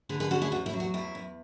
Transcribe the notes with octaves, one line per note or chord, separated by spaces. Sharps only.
D3 G#4 B4
G#4 B4
C#4 F#4 A4
E4 G#4
E2 F#4
E4
F#3
F#4
E2 E4
E2